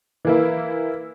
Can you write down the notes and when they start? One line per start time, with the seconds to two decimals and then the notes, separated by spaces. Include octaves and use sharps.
0.25 E3 A#3 E4